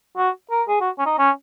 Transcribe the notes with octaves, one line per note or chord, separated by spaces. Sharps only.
F#4
A#4
G#4
F#4
C#4
D#4
C#4